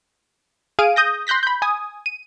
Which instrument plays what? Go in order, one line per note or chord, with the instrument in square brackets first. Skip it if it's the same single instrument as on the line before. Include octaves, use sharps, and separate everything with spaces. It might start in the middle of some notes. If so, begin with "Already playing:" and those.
[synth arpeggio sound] G#4 F5 D7 D#7
D#6 G6 A#6
C6 F#6 G6 A#6 B6
B5 G6
G#5 D#6
D#7